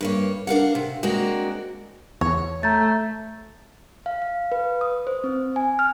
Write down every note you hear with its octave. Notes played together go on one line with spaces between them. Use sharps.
G2 A#3 C#5
D4 A#4 F5 F#5
C3
G#3 A#3 C4 D4 F#4
E2 C#5
A3 A#5 G6 A6
F5
F5
B4
D#6
C5
C4
G#5
F6